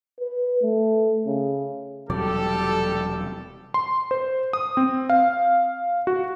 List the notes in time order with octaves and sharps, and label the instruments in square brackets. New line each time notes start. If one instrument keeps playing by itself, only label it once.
[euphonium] B4
A3
C#3
[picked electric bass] E1 C3 F#3 [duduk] G3 [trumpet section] G4 A4 [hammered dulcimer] D5
[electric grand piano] C6
C5
D#6
C4
F5
F#4